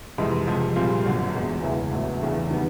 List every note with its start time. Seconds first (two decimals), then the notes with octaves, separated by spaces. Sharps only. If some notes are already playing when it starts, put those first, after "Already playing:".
0.18 F2 C3 E3 G#3 C4
0.47 C#2 C3 F3
0.76 A#2 G3 C4 F4 G#4
1.04 G1 F#2 D3 F#3
1.34 E2 B2 G#3
1.63 E1 D2 C#3 E3 G#3
1.92 A#1 A2 F#3 B3
2.20 E2 C#3 E3 A3 D4
2.51 D#3 G3 B3